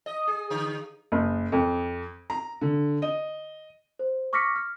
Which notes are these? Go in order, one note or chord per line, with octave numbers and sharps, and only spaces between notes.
D#5
G#4
D3
F#1
F2
A#5
D3
D#5
C5
C#6 D6 F6 A#6 B6 C#7
F6